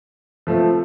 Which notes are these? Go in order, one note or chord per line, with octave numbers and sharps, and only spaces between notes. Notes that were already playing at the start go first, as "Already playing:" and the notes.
F3 A3 C4